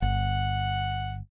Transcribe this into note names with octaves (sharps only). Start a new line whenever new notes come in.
G1 F#5